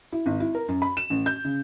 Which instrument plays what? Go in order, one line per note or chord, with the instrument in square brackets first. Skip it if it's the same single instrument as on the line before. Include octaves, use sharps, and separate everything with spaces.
[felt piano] E4
G#1
E4
A#4
F#2
B5
E7
A1
G6
C#3